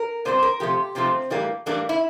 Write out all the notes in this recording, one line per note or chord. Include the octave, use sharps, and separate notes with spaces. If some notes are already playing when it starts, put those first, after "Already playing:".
Already playing: A#4
A#2 G3 C4 C5
A#4
C3 F3 A3 G4
C3 F3 A3 C4
A2 E3 G3 A#3
A2 E3 G3 A#3 D4
E4